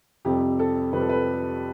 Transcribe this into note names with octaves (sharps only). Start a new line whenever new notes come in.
F2 C3 G3 G4
A4
F2 C3 G3 B4
A4
B4